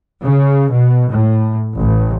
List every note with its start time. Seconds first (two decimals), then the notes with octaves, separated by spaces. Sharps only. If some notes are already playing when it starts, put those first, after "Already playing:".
0.23 C#3
0.72 B2
1.11 A2
1.79 A1